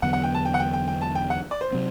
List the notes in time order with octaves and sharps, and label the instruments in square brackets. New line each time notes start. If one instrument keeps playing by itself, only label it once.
[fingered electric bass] E2 D3 F#3 B3 [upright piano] F#5
[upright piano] F#5
G5
A5
G5
F#5
G5
G5
G5
A5
G5
F#5
D5
C5
[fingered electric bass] C3 F#3 C4